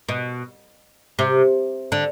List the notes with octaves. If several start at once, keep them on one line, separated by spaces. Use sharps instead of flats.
B2
C3
D3